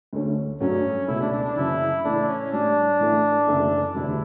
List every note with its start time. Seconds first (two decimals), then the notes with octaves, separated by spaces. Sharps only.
0.13 D2 D3 A3 C#4
0.60 G2 F#3 A3 C#4 D4
1.08 C#2 B2 A3 E4
1.20 D4
1.32 D4
1.44 D4
1.56 F#1 F#2 C#3 E3 E4
2.04 A2 E3 A3 D4 E4
2.28 C#4
2.52 A2 G3 C#4 D4
3.00 A2 E3 A3 E4
3.48 F#1 F#2 E3 A3 E4
3.95 E1 D2 D3 G3 E4